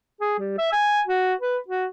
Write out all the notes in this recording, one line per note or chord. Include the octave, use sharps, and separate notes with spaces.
G#4
G3
E5
G#5
F#4
B4
F#4